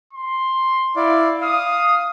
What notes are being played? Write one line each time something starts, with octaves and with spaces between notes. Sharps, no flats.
C6
E4 D5 F5
F5 D#6